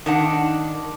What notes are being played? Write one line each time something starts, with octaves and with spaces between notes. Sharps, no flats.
D#3 D4 F#5